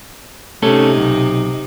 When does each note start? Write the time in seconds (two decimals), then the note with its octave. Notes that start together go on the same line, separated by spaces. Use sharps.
0.62 C3 A3 C#4 D#4 A4
0.97 B1